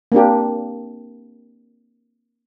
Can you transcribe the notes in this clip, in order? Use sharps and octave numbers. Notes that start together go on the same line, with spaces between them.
A#3 C4 D4 G4